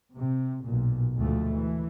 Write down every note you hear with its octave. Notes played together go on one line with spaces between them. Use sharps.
C3
B1 A#2
D2 G#2 F3 A3
E3